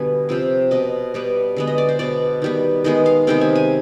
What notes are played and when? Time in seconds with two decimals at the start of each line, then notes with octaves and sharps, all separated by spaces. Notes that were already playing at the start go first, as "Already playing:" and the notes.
Already playing: B2 D3 G3 B3 G#5
0.29 C3 F3 C4
0.71 B2 B3 D#5
1.14 B2 G3 B3
1.56 D3 G#3 B3
1.67 D#5
1.78 D5
1.89 C5
1.99 B2 B3 D5
2.42 D#3 G3 B3
2.84 D#3 G#3 B3 D#5
3.06 F5
3.27 C3 D#3 G#3 B3 G5
3.41 G#5
3.55 G#5